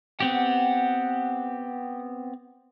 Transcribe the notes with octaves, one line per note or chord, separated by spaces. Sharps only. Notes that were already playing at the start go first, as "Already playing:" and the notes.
B3 C4 G4 F#5